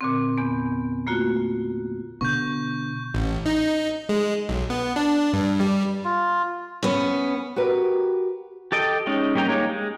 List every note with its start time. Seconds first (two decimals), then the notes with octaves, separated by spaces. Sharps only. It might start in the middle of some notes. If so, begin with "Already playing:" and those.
0.01 A#2 D3 C4
0.38 E2 B3
1.07 A3 A#3 F4 F#4
2.21 B2 D3 B3 C#6 G6
3.14 A1
3.46 D#4
4.09 G#3
4.49 B1
4.70 B3
4.96 D4
5.33 G2
5.60 G3
6.04 F4
6.83 B3 C#4
7.56 F#4 G4 A#4 B4
8.72 G4 A4 D#5 G5
9.07 G#3 C#4 D#4
9.35 G3 A#3 C#4 G5 A#5
9.48 G#3 A#3 D#4 G4 C#5
9.69 G#3